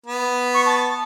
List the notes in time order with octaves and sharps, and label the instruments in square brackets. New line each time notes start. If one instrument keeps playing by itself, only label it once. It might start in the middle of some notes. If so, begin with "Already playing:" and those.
[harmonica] B3
[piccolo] C#6
A5